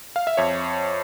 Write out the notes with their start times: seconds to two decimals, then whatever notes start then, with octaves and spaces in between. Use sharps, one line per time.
0.16 F5
0.27 E5
0.37 F2 C#5